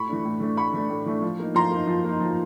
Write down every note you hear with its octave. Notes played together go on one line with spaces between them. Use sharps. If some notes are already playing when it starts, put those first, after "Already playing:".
Already playing: A2 B5 C#6
E3 A3 D4
A2
E3 A3 D4
A2 B5 C#6
E3 A3 D4
A2
E3 A3 D4
F3
A#3 D#4
F3 A#5 C6
A#3 D#4
F3
A#3 D#4
F3